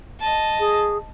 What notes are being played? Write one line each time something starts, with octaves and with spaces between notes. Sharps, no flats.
D#5 A5
G#4